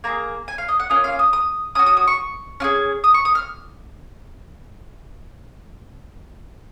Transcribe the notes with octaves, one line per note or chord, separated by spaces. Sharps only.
A#3 F4 G#4 A#5
G#5
F5
D#5
F#5
A#3 C#4 F4 D#5
F5
D#6
D#6
C#4 F#4 D#6
D#6
D#6
C#6
C#4 F4 G#4
D#6
C#6
D#6
F6